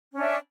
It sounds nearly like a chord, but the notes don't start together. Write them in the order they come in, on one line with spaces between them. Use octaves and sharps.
C#4 D4 E5